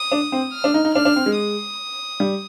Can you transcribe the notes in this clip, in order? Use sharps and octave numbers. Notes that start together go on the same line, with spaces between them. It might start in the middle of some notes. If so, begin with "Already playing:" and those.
Already playing: D#6
D4
C4
F6
D4
D#4
D#4
D4 F6
D4
C4
G#3
D#6
G3